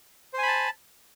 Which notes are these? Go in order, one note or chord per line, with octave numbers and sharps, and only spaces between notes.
C5 G#5 A5 B5